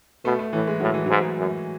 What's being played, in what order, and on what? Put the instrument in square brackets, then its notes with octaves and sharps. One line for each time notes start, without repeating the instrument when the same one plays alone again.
[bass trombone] B2 [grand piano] A3
[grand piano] A3
[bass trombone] A2 [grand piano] E3
[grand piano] G#3
[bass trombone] A2 [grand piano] F#3
[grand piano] E3
[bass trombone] G#2 [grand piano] F#3
[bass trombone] F#2